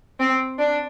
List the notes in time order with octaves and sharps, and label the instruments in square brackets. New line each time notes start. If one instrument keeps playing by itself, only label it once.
[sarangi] C4
D4